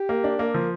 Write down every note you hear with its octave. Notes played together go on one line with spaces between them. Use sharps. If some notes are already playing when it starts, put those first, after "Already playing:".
Already playing: G4
A#3
D4
A#3
F3